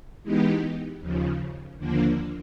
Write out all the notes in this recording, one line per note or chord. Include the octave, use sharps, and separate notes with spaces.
E3 G#3 B3 D#4 G4
D#2 C#3 F3
D#2 D3 F3 A#3 D4